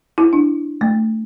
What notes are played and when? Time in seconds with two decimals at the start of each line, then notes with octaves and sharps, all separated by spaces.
0.18 E4
0.33 D4
0.81 A3